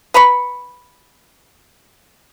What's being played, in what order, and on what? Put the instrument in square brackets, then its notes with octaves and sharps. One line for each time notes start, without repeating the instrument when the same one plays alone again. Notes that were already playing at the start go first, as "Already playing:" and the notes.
[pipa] B4 A#5 B5 C#6